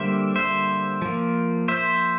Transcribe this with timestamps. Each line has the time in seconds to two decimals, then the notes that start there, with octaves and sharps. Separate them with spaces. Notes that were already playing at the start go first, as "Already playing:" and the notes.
Already playing: D3 G3 A#3 C5 E5
0.36 C5 E5
1.02 F3 A#3
1.68 C5 E5